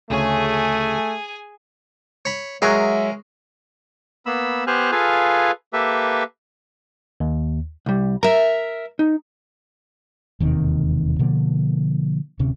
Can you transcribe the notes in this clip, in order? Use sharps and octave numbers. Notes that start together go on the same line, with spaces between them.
D2 C#3 A3 C#4 G#4 G#5
C#5 B5
F#3 G#3 G#4 A#4 E5 C#6
A#3 B3 B5 E6
B3 G4 C5 G#5 F6 F#6
F4 G#4 A4 B4 F5 G#5
A#3 G4 A4 B4 E5
D#2
C2 G3
A#4 E5 A#5
D#4
E1 D#2 C3 D#3
B2 D3 F3 A#3
D1 C3 C#4